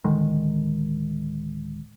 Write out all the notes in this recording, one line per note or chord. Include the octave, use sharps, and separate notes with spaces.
D1 D3 D#3 G#3